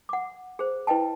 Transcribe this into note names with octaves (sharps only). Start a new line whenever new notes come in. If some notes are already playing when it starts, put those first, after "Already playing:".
F#5 D6
G#4 C5
E4 B4 D#5 G5 A5